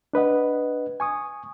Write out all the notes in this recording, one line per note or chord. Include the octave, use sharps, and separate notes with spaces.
D4 B4 D#5 F#5
G#5 C#6 D#6